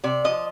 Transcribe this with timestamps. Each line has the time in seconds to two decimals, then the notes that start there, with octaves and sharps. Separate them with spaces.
0.04 C3 D5
0.24 F3 D#5